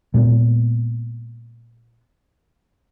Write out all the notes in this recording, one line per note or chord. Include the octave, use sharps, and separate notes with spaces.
A#2 G#3 B3